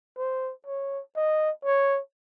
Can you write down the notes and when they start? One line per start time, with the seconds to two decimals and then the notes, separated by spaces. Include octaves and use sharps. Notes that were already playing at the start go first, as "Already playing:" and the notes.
0.18 C5
0.66 C#5
1.16 D#5
1.65 C#5